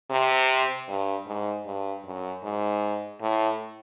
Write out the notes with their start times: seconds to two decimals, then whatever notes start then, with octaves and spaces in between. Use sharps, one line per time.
0.11 C3
0.89 G2
1.27 G#2
1.66 G2
2.05 F#2
2.43 G#2
3.21 A2